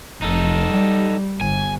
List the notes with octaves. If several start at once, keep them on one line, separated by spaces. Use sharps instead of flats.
F1 D#4 A4
G3
G1 G#5